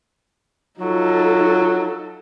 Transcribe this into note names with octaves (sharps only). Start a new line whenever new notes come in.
F#3 D#4 F4 A4